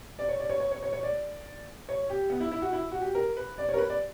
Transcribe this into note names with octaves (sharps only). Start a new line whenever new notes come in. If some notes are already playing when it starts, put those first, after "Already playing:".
D5
C#5
D5
C#5
C#5
C#5
C#5
C#5
D5
C#5
G4
B3
E4
E4
F#4
E4
F#4
G4
A#4
B4
D5
C#5
A#4
B4
D5